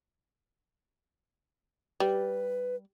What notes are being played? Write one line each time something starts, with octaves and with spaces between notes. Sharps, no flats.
G3 B4